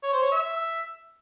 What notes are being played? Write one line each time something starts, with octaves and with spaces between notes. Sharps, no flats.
C#5
C5
C#5
E5